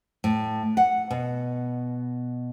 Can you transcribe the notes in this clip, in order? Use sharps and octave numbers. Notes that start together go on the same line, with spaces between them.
A2
F#5
B2